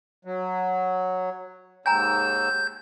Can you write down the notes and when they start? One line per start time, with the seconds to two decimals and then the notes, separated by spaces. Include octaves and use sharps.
0.25 F#3
1.86 D#2 G#2 G5 G#5 A#5 E6 G6